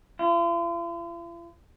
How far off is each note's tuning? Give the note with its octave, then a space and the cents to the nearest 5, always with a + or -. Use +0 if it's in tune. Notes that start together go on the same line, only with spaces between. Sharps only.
F4 -45